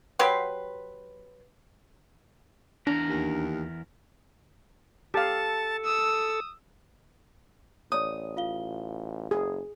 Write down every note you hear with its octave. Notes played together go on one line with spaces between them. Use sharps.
F#3 G4 B4 C6
E2 D4 A#4
D#2
G4 A4 F5 A5
D#6 E6
A1 C#5 D5 D#6
F4 F5 G7
F#1 G#4